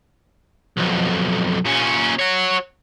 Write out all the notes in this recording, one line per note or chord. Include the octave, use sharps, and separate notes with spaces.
B1 F2
A#2 C#4
F#4 C#5